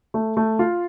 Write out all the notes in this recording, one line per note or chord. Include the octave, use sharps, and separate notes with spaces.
A3
A3
F4